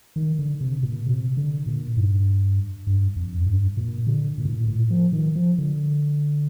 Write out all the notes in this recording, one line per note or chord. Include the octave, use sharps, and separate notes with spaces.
D#3
D3
C3
A#2
C3
D3
A#2
G2
G2
F2
G2
A#2
D3
A#2
A2
A#2
A2
F3
D#3
F3
D3